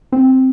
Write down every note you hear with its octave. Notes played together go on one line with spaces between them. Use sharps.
C4